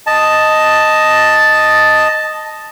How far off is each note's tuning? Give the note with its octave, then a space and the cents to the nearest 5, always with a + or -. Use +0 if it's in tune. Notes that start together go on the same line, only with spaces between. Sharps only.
D#5 +0 A5 +0